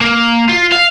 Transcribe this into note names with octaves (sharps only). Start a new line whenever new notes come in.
A#3
F4
F5